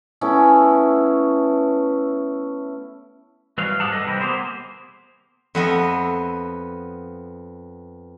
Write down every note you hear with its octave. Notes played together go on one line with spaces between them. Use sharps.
A3 B3 C#4 E4
E3 F#3 G3 B4 F5
G#2 G4 G#4 F#5 A5
G3 A4 B4 D#5
C3 E3 C4 E4
A#3 B3 G4 G#4 C5
F2 B3 D#5 E5